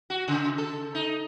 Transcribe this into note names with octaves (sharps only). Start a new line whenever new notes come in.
F#4
C#3
A4
D#4